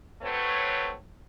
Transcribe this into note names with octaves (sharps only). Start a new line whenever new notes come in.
F#3 A3 C4 B4 C#5